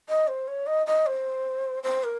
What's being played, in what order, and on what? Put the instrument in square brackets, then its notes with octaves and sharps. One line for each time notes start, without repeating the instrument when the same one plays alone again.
[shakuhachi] D#5
C5
C#5
D#5
D#5
C5
C5
A#4